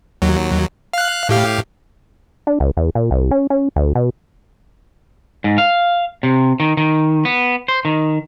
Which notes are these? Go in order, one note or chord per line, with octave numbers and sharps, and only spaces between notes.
D#2 F#3
F5 F#6
A2 G4 F5
D4
C#2
E2
A#2
C2
C#4
C#4
D2
B2
G#2
F5
C3
D#3
D#3
B3
C5
D#3